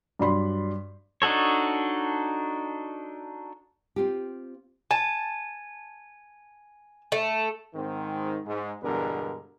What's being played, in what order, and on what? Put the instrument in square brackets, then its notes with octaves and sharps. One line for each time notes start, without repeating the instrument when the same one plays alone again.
[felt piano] G2 F#3 D5 B5 C6
[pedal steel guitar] D4 D#4 F#4 A4 C#5
[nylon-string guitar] C4 F4 G4
[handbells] G#5 [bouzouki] A5
[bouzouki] A3
[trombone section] G#2 D#3 C4
G#2
E2 G2 B2 D3 G#3 A#4